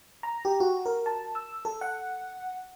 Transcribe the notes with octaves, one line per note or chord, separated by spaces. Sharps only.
A#5
G4
F#4
A#4
A5
E6
A4
F#5